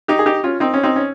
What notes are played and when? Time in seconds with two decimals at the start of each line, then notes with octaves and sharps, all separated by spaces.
0.08 D#4 G4
0.19 G#4
0.26 D#4 G4
0.44 C#4 F4
0.60 C4 D#4
0.74 C#4
0.83 C4 D#4
0.96 C#4